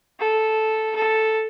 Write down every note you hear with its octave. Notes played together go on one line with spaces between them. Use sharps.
A4
A4